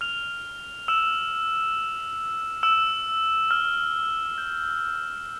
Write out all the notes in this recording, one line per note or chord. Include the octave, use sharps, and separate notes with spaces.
F6 F7
E6 E7
E6 E7
F6
G6